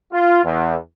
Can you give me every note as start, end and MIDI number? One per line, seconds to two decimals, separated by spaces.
0.12 0.40 65
0.44 0.75 40